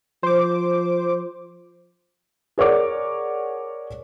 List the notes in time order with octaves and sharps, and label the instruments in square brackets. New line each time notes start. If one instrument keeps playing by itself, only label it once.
[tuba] F3 [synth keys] C5 D6
[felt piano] G#4 A#4 C#5 D5 F#5 D6